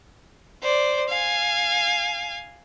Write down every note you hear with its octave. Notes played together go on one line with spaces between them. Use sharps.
C5 D5
F5 G#5